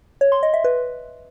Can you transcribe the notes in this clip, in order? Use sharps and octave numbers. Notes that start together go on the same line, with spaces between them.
C#5
C6
D#5
E5
B4